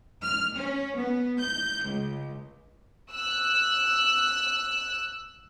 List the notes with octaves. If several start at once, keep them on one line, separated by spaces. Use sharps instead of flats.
F6
C#4
B3
G6
C#2
E6 F#6